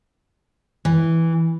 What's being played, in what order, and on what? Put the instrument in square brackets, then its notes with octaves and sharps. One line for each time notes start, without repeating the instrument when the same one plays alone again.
[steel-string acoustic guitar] E3